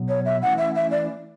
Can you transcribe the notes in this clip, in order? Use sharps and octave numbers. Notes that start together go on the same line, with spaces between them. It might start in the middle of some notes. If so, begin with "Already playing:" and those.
Already playing: B2 F#3 B3
C#5
E5
E3 A3 C#4 E4 F#5
E5
E5
D5